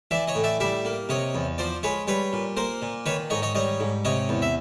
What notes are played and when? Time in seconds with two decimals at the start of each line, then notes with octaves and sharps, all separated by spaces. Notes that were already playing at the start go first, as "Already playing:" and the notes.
0.11 E3 D5 E5
0.28 C#5 D#5
0.35 A2
0.44 D5 E5
0.60 G3 D5 E5
0.85 A#3
1.09 C3 C#5 D#5
1.35 E2
1.58 F3 C5 D5
1.83 G#3 B4 C#5
2.07 G3 B4 C#5
2.33 A#2
2.57 A#3 A#4 C5
2.82 A#2
3.06 D#3 B4 C#5
3.30 G#2 C#5 D#5
3.42 C#5 D#5
3.55 G3 C#5 D#5
3.80 G#2
4.05 C3 C#5 D#5
4.29 E2
4.42 E5